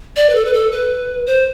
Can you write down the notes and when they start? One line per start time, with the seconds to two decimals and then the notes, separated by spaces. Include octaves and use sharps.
0.16 D5
0.29 B4
0.35 A4
0.45 B4
0.53 A4
0.72 B4
1.27 C5